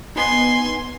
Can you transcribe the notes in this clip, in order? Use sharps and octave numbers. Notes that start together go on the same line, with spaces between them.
B3 D#4 G#5 C6